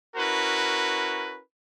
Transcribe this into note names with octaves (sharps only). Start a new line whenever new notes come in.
C#4 E4 F#4 A#4 B4